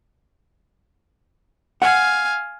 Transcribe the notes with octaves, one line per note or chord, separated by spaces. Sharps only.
F5 F#5 G#5